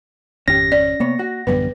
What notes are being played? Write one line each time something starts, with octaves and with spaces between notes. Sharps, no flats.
G#1 F2 D#3 C#4 G4 A#6
C#4 D5
C3 A#3 B3 C#5
F#4
A1 F#2 A2 D3 G3 B3 B4